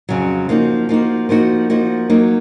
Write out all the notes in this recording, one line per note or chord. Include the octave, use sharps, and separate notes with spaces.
F2 C#3 F#3
F3 A#3 D#4 F#4
F3 A#3 D#4 F#4
F3 A#3 D#4 F#4
F3 A#3 D#4 F#4
F#3 A#3 D#4